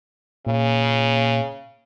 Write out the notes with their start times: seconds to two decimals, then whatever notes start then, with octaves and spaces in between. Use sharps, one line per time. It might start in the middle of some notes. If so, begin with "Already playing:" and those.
0.47 A#2 C#3